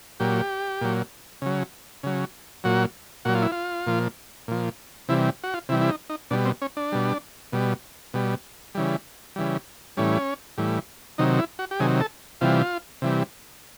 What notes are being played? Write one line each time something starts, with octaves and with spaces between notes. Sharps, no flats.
A#2 F#3 G4
A#2 F#3
C#3 F#3
C#3 F#3
A#2 F#3 F#4
A#2 F#3 F#4
F4
E4
F4
A#2 F3
A#2 F3
C3 E3 G3 E4
F#4
F4
C3 E3 G3 E4
E4
D#4
D#4
B2 G3 D4
C4
C#4
D4
B2 G3
B2 G3
B2 G3
C#3 E3 G3
C#3 E3 G3
A2 E3 G3 C#4
A2 E3 G3
C3 D#3 F#3 D#4
E4
F#4
G4
C3 D#3 F#3 G#4
A4
C3 E3 G3 F4
C3 E3 G3